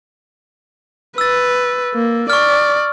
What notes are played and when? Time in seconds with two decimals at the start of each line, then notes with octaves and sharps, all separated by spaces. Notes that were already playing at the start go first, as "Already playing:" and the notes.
1.18 B4 E6 A6
1.94 A#3
2.30 D5 C#6 F6